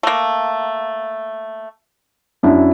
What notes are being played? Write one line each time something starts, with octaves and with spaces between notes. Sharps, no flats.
A3 A#3
F#2 D4 E4